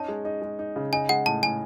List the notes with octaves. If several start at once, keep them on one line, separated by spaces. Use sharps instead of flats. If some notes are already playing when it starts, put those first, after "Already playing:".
Already playing: C#4 D#4 A5
G#3
D#4
G#3
D#4
C#3
D#4 G#5
G#3 F#5
A2 A5
A2 G#5